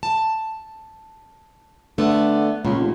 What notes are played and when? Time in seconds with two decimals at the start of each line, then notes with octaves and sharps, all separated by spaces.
0.03 A5
1.98 D3 A3 B3
2.65 C#2 A#2
2.80 F1